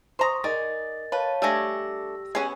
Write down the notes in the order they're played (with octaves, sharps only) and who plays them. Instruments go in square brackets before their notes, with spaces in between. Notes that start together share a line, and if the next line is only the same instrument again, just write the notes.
[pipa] C5 A#5 [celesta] C6 C#6 D#6
[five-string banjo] D#4 G#4 D5 [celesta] A#4 D#5 A6
[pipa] B4 [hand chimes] C#5 F5 A5
[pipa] G3 G#5 [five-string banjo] A3 D4 [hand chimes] G4 A#6 [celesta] E6
[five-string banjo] B3 C#4 F#5 [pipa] G#4 G#5